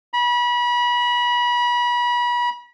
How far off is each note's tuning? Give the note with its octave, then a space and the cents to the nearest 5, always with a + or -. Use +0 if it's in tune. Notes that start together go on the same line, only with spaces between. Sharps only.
B5 -30